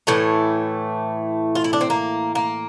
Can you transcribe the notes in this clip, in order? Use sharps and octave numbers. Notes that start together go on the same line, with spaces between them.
A2 E3 A3
F4
E4
D4
C4
A#3
A#3